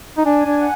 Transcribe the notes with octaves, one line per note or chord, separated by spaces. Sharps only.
D#4
D4 G#5
D4
F#5